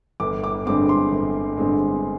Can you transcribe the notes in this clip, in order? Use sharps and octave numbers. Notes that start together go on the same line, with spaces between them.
G1 D6
D6
G2 D3 G#3 C4 D6
C6
G1
G2 D3 G#3 C4